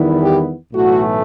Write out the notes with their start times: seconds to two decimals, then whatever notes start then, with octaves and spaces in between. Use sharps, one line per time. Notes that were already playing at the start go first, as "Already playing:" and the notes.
Already playing: E2 D#3 G3 B3 E4
0.22 G4
0.73 B1 A2 E3 A3 F#4